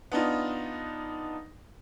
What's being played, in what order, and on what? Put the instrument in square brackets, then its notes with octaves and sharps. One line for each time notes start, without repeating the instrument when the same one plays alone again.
[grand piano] B3 D4 D#4 F4